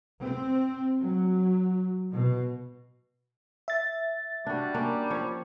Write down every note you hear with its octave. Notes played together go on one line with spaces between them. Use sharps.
C4
F#3
B2
E5 A6
G3 D4 F#4
A#3 C#4 D4
F3 C#5